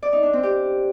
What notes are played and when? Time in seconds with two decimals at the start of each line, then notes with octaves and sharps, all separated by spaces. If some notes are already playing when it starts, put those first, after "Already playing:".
0.03 D5
0.13 D#4
0.23 D4
0.33 C4
0.43 G4